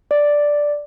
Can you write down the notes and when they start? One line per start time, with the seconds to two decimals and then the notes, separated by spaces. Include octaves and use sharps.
0.11 D5